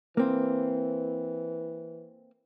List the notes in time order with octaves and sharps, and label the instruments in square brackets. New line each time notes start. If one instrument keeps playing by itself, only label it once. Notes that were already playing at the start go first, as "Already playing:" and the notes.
[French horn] E3 [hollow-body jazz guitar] A#3 C4